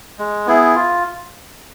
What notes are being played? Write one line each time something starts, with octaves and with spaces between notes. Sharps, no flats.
G#3
B3 E4 G#4
F4